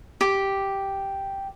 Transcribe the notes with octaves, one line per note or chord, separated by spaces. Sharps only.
G4